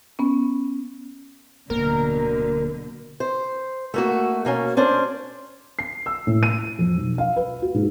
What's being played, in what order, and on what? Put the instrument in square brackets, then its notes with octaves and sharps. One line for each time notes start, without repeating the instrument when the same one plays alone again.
[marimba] B3 C#4
[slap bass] D1 A#3 [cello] B2 D3 [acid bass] A#4
[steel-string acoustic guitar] C5
A3 A#3 F#4
B2 A#3 C#4
C#4 D4 C5
[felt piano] C7
E6
A2
D#7
F2
B1
F5
B4
F#4
G#2